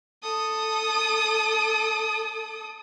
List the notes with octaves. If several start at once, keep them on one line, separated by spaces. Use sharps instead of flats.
A4 D#6